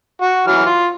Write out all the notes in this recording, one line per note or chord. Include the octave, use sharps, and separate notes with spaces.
F#4
E3 F#3 F6
F4